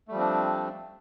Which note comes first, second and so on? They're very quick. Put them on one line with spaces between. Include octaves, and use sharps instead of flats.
A3 G3 F3 C4 D4